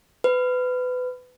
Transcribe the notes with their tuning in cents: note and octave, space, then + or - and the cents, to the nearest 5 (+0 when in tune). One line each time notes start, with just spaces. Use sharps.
B4 +25